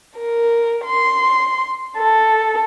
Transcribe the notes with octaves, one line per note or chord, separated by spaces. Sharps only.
A#4
C6
A4